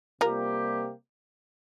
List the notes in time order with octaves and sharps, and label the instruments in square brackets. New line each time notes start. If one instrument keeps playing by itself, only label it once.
[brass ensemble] C3 G3 A#3 G4 [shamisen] F4 A#4